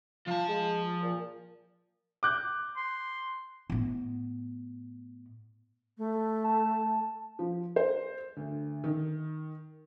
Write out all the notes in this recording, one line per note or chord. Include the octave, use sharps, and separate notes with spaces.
F3 F4 A5
G#3
A#2
D6 F#6 G6
C6
A2 B3
A3
A5
F3
C5
D2
D#3